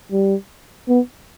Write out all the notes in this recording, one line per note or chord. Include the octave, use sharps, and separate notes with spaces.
G3
B3